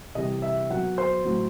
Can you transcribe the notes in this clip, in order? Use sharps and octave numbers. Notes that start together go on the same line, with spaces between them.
C3 E3 G3 D#5
E5
B2 F#3 F#5
C5
A2 F#3